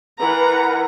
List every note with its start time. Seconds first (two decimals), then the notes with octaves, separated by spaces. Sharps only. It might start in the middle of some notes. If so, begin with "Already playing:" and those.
0.19 E3 A#4 B4 F#5 A#5